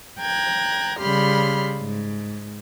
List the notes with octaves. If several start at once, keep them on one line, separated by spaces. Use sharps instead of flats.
G5 A#5 F#6 G#6
C#3 G3 G4 B5 C6 F6
G#2